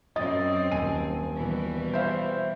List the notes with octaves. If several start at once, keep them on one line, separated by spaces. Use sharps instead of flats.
F#2 C4 D#5 D#6 A6
D#1 G#5 D#7
B2 E3 G3
C5 E5 F5